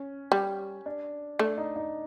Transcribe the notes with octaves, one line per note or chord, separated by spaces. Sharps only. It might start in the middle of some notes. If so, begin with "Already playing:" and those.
Already playing: C#4
G3
D4
A3 D4
D#4
D#4